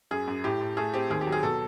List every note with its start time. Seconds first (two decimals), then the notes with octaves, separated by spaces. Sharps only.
0.11 F#2 G#4
0.27 F#2
0.44 A2 G4
0.61 A2
0.77 A3 G#4
0.94 C4 G4
1.10 D#2 G#4
1.21 G4
1.27 F#3
1.32 G#4
1.43 B2 A4